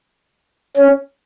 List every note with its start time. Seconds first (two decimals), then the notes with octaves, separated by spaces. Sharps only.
0.77 C#4